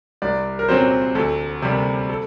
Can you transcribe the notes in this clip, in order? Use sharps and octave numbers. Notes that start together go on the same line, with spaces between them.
C2 D5
A#4
A#2 F#3 C4 C5
D2 A4
C3 G3 A#3
A4